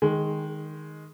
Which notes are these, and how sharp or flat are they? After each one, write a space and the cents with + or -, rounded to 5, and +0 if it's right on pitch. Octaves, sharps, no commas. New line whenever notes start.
D#3 +0 G#3 +0